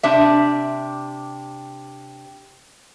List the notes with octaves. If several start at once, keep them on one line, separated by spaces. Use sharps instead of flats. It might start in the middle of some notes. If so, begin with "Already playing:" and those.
C3 D4 E5